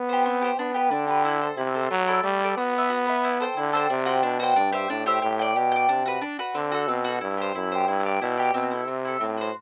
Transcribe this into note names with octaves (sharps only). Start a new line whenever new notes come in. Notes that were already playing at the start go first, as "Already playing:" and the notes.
Already playing: B3
G4 C5
C4
G4 C5
B3 D4
G4 B4
D3 D4
G4 B4
E4
A4 C5
C3 E4
A4 C5
F#3 A3
E4 A4 D5
G3 A3
E4
A4 D5
B3 F#4
B4 E5
F#4
B4 E5
E4
A4 C5 G5
D3 E4
A4 C5 G5
C3 D4
F#4 C5 G5
B2 D4
F#4 C5 G5
G2 D4
G4 C5 E5
A2 D4
G4 C5 E5
A2 G4
D5 G5
B2 G4
D5 G5
C3 D4
F#4 B4
D4
F#4 B4
D3 C4
F#4 A4
B2 C4
F#4 A4
G2 E4
G4 C5
F#2 E4
G4 C5
G2 E4
G4 D5
B2 E4
G4 D5
B2 C4
E4 A4
C3 C4
E4 A4
A2 C4
F#4 C5